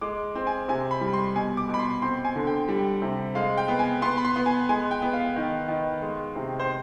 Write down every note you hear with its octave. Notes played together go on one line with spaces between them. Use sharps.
G#3 D6
C4
G#5
C3 G#5
B5
G3
C6
B2 G#5
D6
B2
B5
C6
C4 C6
G#5
D3
G5
G3
C3
G#3 F5
G5
B3
G#5
B3 C6
B5
C6
B3
G#5
G#3 G#5
G5
B3
F5
D#3
D#3
G#3
C3
C5